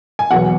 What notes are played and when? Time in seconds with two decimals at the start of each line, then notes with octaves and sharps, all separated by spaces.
0.19 G#5
0.31 E2 B2 F#3 B3 F#5